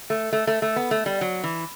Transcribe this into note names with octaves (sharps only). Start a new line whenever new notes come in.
A3
A3
A3
A3
B3
A3
G3
F#3
E3